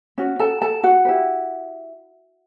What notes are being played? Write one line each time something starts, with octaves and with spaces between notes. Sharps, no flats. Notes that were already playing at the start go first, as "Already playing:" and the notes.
C#4 F#4
A4 A5
A4 A5
F#4 F#5
E4 G4 B4